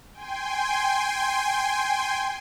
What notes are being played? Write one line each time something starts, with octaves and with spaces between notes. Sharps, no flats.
G5 G#5 C6